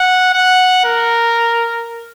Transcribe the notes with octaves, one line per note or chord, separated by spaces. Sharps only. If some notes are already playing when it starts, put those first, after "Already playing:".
Already playing: F#5
F#5
A#4